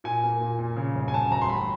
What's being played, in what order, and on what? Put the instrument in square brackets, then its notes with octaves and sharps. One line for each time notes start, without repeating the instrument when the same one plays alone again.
[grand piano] A#2 G#5
A#3
A#2
A#2
C#3
G1
G#5
C#3 A5
G1 A#5
C6
A1 B5